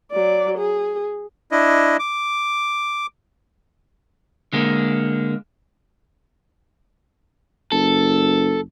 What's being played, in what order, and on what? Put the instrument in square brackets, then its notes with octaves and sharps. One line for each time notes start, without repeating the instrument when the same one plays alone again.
[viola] F#3 D5
G#4
[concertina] D4 E4 D#5
D6
[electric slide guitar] D3 G#3 A#3
[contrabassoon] F#1 [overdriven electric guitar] A4